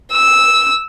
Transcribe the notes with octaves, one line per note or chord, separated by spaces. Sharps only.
E6